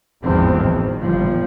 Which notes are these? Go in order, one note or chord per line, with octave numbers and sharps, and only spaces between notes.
G#1 E2 A2 F3 C4
E2 D#3
G1 A#2 F3 G3